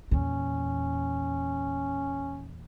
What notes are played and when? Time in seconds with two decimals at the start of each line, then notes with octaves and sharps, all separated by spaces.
0.11 E2 A#2 C#4